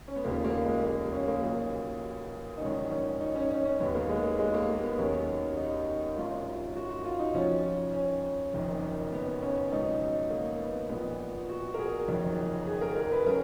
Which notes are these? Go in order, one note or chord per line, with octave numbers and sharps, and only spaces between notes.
C#4
B3
F1 D#2 C#3 F3 A#3
A#3
G#3
A#3
C#4
A#3
B1 A#2 F#3
D#4
A#1 G#2 D#3 F#3 C#4
C#4
D#4
C#4
C#4
C#4
D#2 D#3 F#3 B3
A#3
G#3
A#3
G#3
A#3
A#3
B3
D#2 D#3 F#3 C#4
D#4
G#1 F#2 D#3 F#3 F4
F#4
F#4
F4
D#4
F2 F3 C#4
C#4
F#1 F2 D#3
B3
C#4
C#2 B2 F#3 D#4
A#3
B3
A#1 A#2 F3 B3
F#4
A#4
G#4
F#1 F2 D#3 F#3
G#4
A#4
A#4
B4
C#3 F#3 A#4